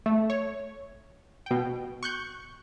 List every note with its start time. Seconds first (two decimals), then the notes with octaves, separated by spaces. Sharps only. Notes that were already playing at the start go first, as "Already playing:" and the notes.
0.06 A3
0.30 C#5
1.46 B2 G5
2.03 C#6 F#6 G6